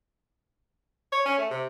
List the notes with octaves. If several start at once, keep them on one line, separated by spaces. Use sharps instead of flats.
C#5
C#4
A3
C3